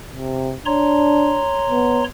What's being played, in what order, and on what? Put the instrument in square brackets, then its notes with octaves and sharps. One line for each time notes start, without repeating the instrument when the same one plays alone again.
[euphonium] C3
[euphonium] D4 [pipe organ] C#5 A#5 C6
[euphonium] B3